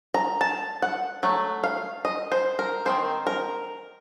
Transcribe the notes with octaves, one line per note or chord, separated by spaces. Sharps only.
A#5
A5
F#5
F#3 A3
F5
D#5
C5
A#4
D#3 F#3 C4 D#4 C5
A#4